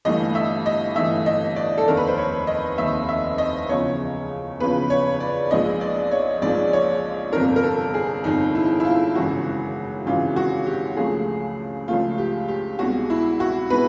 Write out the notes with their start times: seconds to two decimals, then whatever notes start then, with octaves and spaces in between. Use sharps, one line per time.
0.05 G1 G2 E3 A3 D#5
0.35 E5
0.66 D#5
0.96 G1 G2 E3 A3 E5
1.26 D#5
1.56 D5
1.78 A4
1.87 F1 D#2 D#3 A#4
1.97 B4
2.07 C5
2.17 C#5
2.47 D#5
2.78 F1 D#2 D#3 E5
3.09 E5
3.38 D#5
3.69 E2 C#3 F3 C#5
4.60 E2 C#3 F3 B4
4.90 C#5
5.20 D5
5.51 A#1 G#2 F3 G#3 D#5
5.81 D5
6.11 C#5
6.42 A#1 G#2 F3 G#3 D5
6.73 C#5
7.33 G1 F2 C3 A#4
7.56 A#4
7.63 A4
7.94 G#4
8.24 G1 F2 C3 D#4
8.55 E4
8.80 E4
8.85 F4
9.15 G#1 F#2 C#3 E3 F#4
10.06 G#1 F#2 C#3 E3 F4
10.36 F#4
10.66 G4
10.97 C#2 C#3 F3 A3 G#4
11.88 C#2 C#3 F3 A3 F4
12.18 G4
12.48 G4
12.79 C2 B2 G#3 F#4
13.10 E4
13.40 F#4
13.70 B2 G#3 B4